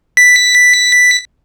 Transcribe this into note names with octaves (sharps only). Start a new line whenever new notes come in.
B6